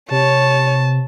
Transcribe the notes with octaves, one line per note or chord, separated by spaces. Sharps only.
C3 C#5 A5